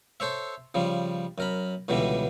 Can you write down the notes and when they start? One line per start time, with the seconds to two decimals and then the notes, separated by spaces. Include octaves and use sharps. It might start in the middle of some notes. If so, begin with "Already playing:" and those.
0.20 A4 C5 C#5 E5
0.74 C#3 F3 G3
1.38 F#2 A#4 B5
1.88 C#2 B2 D3 E3 G3